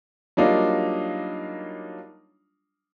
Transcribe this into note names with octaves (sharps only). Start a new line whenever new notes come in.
F#3 G3 A#3 D4 D#4 F4